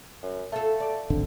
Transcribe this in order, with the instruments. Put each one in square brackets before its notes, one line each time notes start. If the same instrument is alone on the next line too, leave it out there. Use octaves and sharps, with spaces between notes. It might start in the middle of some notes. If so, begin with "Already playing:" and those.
[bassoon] F#2
[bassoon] A3 [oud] F4 A4
[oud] D5
[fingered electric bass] D1 G#1 D3